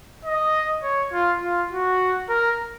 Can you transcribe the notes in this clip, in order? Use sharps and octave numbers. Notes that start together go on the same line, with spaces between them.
D#5
C#5
F4
F4
F#4
A#4